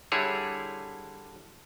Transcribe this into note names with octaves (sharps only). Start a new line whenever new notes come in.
D3 G3 E4 G#4 C#5